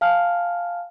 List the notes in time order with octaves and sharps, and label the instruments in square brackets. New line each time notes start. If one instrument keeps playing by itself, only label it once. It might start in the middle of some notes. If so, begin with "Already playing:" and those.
[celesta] F5 G#5 A5 F6